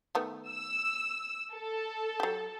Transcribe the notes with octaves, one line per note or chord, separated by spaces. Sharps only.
D#3 A3 B3
E6
A4
F#3 G4